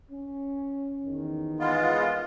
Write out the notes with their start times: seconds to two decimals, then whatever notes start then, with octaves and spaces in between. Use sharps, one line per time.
0.11 C#4
1.05 E2 D#3
1.60 G#3 B3 F4